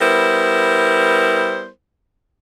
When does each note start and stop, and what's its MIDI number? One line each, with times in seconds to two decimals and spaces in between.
0.01 1.69 55
0.01 1.69 59
0.01 1.69 64
0.01 1.69 70
0.01 1.69 72